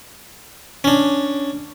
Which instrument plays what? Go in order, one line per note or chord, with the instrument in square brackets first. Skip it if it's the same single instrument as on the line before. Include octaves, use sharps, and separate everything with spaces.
[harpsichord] C#4 D4